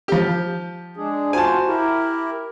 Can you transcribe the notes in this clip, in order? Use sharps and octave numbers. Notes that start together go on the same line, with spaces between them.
F3 G4
G#3 D4 G#4
F4 F#4 C5 G#5 A5
E4 G4 A#4